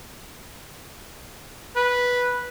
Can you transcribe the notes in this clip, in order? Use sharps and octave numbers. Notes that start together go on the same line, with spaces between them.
B4